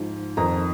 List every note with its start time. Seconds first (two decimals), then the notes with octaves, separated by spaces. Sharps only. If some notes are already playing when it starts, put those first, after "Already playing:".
Already playing: G#2 F3
0.37 F2 D#3 A#5